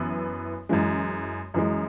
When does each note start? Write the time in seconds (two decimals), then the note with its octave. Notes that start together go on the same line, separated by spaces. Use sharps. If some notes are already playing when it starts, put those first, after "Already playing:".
Already playing: F#2 E3 B3 E4 B4
0.69 F#2 E3 G#3
1.54 F#2 E3 G#3